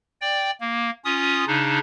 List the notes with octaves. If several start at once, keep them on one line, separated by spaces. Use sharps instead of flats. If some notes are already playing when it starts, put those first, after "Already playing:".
D5 G5
A#3
C#4 F4 D#6
C#3 D4 D#4